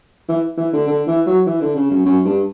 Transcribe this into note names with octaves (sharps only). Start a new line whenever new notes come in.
E3
E3
D3
D3
E3
F#3
E3
D3
C#3
F#2
F#2
G2